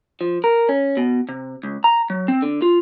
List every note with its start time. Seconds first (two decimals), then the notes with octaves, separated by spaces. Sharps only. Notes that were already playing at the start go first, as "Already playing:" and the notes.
0.21 F3
0.44 A#4
0.69 C#4
0.97 B2
1.29 C3
1.63 C#2
1.84 A#5
2.10 F#3
2.28 C4
2.42 D3
2.62 F4